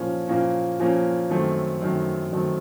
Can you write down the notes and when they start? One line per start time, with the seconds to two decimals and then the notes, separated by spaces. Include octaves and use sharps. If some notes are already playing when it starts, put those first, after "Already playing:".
Already playing: A#2 F3 A#3 C#4
0.28 A#2 F3 A#3 C#4
0.79 A#2 F3 A#3 C#4
1.30 F#2 D#3 F#3 A3 C4
1.81 F#2 D#3 F#3 A3 C4
2.32 F#2 D#3 F#3 A3 C4